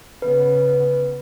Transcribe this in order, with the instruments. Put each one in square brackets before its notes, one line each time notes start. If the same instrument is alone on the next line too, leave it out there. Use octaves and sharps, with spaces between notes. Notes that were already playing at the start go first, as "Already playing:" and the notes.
[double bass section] C#3 B3 [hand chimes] B4